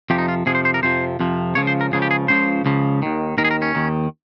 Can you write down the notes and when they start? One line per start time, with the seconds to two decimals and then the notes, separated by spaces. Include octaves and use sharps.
0.10 F2 C3 F3 G4
0.18 D#4
0.28 F4
0.46 F2 C3 F3 G#4
0.55 C5
0.65 C5
0.74 A#4
0.82 F2 C3 F3 C5
1.20 F2 C3 F3
1.55 C#2 C#3 F3 C#5
1.67 C5
1.81 A#4
1.92 C#2 C#3 F3 G#4
2.02 G4
2.11 G#4
2.28 C#2 C#3 F3 C5
2.65 C#2 C#3 F3
3.02 D#2 D#3
3.38 D#2 D#3 A#4
3.45 G#4
3.51 A#4
3.62 C#4
3.75 D#2 D#3